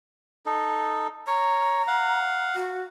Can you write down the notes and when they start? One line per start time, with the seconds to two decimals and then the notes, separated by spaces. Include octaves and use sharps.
0.46 D#4 A4
1.27 C#5 A#5
1.87 F5 F#5
2.55 F#4